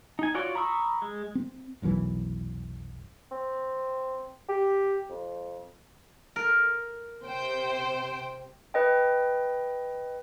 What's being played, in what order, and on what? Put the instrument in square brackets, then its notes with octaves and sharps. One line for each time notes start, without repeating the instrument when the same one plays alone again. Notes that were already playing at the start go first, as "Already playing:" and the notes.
[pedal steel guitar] D#4 G#5
F4 F#4 C#5 D5
A#5 B5 C#6 D#6 E6
G#3
[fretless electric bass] C4
F1 B1 F#2 E3
[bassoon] C4
G4
F2
[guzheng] A#4
[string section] C3 C5 G5
[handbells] B4 D#5 G5